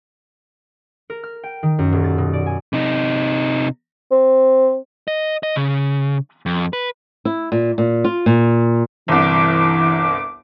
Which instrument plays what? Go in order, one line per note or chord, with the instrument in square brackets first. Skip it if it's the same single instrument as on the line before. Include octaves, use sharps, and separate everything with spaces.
[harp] A#4
F6
G5
D#3
F#2
D#1
A6
B2
D5
G#5
[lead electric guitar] C3 D#4
[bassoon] C4
[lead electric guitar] D#5
D#5
C#3
F2
B4
[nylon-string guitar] E4
A#2
A#2
F4
A#2
[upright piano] G1 C2 [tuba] E3 [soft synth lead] D6